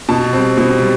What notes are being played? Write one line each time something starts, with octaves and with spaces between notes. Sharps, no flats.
B2 A5
G3 C4
B2
G3